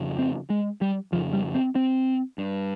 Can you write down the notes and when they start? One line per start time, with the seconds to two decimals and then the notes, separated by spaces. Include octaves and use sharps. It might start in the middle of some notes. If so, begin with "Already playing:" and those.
Already playing: F2 C#3
0.19 C4
0.50 G#3
0.81 G3
1.12 F2 C#3 F3
1.33 G3
1.55 C4
1.75 C4
2.38 G2